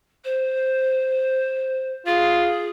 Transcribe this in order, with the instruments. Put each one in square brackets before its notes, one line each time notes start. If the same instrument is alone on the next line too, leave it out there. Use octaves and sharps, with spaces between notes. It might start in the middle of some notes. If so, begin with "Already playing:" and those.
[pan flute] C5
[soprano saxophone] F4 [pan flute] G#4